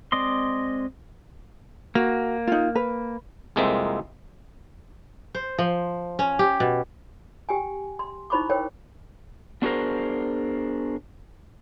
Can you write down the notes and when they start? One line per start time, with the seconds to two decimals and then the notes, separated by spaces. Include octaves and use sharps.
0.12 G#3 C4 D5 D#5 C6
1.95 A#3 F#4
2.47 D#4 F4
2.75 B4
3.56 C2 F2 G#3 A#3 C4 E5
5.34 C5
5.58 F3
6.19 C#4
6.39 G4
6.60 B2
7.49 G4 G5 G#5
7.99 C6
8.30 D#4 E4 C5 B5 C#6 D6
8.50 A#4 C5 C#5 G5
9.62 B3 D4 F#4 G#4 A#4 C5